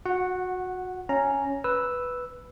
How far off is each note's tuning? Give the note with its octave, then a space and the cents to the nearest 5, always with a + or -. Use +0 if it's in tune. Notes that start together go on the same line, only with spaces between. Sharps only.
F#4 -25 F#5 +0
C#4 +0 A#5 +0
B4 +0 E6 +0